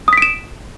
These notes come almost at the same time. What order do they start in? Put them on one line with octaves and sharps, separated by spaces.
D#6 B6 D7 E7